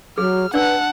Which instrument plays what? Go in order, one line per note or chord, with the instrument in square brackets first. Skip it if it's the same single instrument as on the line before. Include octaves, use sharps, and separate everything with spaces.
[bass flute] F#3 [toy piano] G#4 [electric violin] F6
[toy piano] D4 D5 E6 [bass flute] B4 [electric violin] F#5 A5